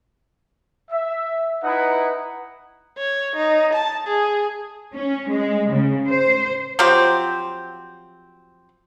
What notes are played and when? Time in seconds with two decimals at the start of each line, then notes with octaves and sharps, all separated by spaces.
0.90 E5
1.64 D#4 E4 B4 F#5 A#5 D#6
2.98 C#5
3.36 D#4
3.74 A5
4.07 G#4
4.95 C#4
5.29 G#3
5.71 C#3
6.08 C5
6.79 F3 F#3 C4 G4